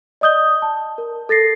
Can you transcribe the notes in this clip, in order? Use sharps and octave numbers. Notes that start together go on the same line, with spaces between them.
D5 D#5 D#6 G6 G7
A5
A#4
A4 A6 A#6 C7